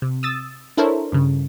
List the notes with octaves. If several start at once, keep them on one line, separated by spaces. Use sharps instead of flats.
C3
D#6 E6 A6
D4 E4 A4 A#4 C5 C#5
G2 C#3